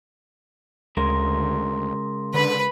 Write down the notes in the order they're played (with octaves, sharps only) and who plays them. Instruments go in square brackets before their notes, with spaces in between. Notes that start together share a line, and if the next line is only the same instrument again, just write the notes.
[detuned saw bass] D2 [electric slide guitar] C#3 G#3 A#4 [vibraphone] C6
[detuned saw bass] D3 [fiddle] B4 B5